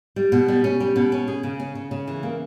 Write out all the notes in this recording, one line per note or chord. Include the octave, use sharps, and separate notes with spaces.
G3
B2
G3
C#4
G3
B2
C#4
G#4
C#3
C#4
C#3
C#3
E3
A#3